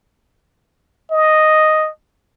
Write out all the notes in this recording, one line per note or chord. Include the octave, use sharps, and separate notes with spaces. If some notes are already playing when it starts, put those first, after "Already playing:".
D#5